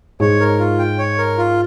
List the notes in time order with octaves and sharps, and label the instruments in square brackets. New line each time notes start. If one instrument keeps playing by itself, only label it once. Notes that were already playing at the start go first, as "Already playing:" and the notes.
[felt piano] G#2 G#3 [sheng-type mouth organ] C#5
[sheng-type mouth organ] A#4
F4
G5
C#5
A#4
F4